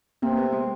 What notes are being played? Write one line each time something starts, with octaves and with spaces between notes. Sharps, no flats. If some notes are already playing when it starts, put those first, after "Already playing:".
C3 A#3 C4
A3 B3
G#3